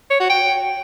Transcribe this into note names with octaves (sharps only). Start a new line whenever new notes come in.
C#5
F#4
G5